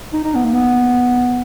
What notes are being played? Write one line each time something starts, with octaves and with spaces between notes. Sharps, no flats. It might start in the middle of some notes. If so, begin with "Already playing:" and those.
D#4
D#4
B3
A#3
B3